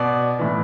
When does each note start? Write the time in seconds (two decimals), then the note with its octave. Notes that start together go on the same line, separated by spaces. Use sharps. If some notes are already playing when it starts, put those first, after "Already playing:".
Already playing: B2 D5
0.39 A2 E3